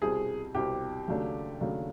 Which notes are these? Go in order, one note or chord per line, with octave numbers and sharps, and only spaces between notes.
C2 B2 G3 C4 G#4
C2 B2 G3 C4 G4
D#2 C#3 F#3 A3 D4
D#2 C#3 F#3 A3 D4